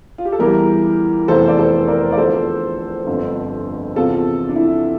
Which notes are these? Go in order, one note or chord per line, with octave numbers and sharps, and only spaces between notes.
F4
G4
A4
E2 E3 G3 G4 A#4
F1 E2 E3 A4 C5
D5
A4 C5
A#4 D5
D5
E2 D3 F3 A4 C5
G1 F2 D3
E2 C3 F3 F4 A4
D4
E4